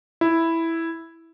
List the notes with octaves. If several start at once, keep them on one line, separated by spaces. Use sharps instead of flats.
E4